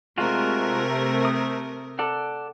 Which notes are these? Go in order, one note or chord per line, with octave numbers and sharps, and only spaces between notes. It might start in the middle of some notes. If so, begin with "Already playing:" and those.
C3 G#3 A3 F4 F#4 A#4
D#6
A4 D5 F#5